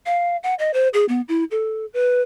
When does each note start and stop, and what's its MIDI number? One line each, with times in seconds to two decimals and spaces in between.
0.06 0.37 77
0.43 0.54 78
0.59 0.71 75
0.74 0.88 72
0.94 1.05 68
1.09 1.21 59
1.28 1.44 64
1.51 1.86 69
1.94 2.22 71